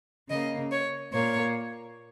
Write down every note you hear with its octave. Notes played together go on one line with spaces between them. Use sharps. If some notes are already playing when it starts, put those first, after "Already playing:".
C#3 A#3 D#5
C#5
A#2 A#3 C#5